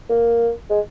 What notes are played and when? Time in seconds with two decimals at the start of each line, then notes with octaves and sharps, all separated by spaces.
0.09 A#3
0.70 G#3